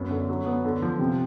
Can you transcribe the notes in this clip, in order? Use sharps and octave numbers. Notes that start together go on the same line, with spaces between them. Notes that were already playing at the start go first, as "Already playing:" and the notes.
Already playing: F#2 B3
D3
F#3
B3
D3
F3
C3